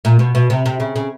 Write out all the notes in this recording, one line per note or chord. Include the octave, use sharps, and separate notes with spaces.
A#2
B2
B2
C3
C3
C#3
C#3